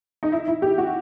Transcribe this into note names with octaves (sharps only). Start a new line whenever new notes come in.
D#4
E4
E4
G4
F#4